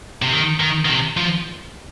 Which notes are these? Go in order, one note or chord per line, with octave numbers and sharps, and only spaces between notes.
C3
D#3
D#3
D#3
C3
F3